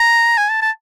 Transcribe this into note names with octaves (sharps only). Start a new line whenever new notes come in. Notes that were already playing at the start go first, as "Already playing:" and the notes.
Already playing: A#5
G#5
A5
A5